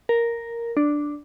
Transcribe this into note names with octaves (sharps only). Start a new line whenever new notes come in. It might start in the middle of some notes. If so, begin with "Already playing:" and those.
A#4
D4